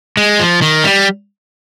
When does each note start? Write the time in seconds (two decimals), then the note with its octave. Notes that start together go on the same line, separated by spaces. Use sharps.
0.17 G#3
0.39 F3
0.62 D#3
0.84 G3